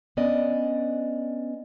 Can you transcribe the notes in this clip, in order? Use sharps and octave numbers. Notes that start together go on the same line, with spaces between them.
B3 C#4 D4 D5 D#5